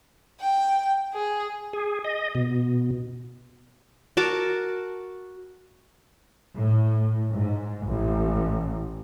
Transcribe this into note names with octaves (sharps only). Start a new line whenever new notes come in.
G5
G#4
G#4
D#5
B2
F#4 A#4 A5 D6
A2
G#2
A1